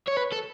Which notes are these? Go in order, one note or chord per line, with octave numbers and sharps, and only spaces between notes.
C#5
B4
A4